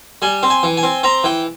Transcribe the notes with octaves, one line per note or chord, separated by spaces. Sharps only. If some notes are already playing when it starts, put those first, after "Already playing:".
G3 G#5
C4
G#5
E3
G#5
C4
C4 A#5
E3 G5